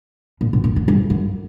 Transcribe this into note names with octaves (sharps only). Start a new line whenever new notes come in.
A#2
B2
A#2
A2
G2
F#2